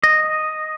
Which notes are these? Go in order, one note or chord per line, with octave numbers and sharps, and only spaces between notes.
D#5